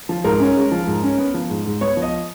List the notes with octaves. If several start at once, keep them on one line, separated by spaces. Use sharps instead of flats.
F3
G#2 A#4
C#4
G#3
F3
G#2
C#4
B3
F3
G#2
G#2
B3 C#5
F3
D#5